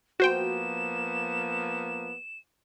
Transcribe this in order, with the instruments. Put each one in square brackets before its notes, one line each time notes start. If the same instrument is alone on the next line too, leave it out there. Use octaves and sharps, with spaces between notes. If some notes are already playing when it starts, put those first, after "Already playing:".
[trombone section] F3 A#3 B3 [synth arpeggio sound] F#4 C5 G5 [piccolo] E7